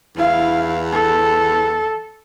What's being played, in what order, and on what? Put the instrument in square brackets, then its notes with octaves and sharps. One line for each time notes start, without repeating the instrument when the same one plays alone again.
[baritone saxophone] E2 [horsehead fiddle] E4 F5
[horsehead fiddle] A4